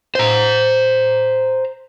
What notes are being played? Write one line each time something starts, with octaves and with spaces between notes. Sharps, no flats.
C5 A#5